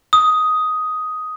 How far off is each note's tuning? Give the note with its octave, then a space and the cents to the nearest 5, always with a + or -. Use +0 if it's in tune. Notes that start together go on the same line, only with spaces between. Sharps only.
D#6 +5